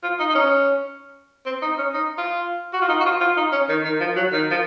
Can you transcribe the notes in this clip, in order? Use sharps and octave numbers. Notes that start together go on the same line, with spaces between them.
F4
D#4
D#4
C#4
C4
D#4
C#4
D#4
F4
F#4
F4
D#4
F#4
F4
F4
D#4
C#4
D#3
D#3
F3
F#3
D#3
F3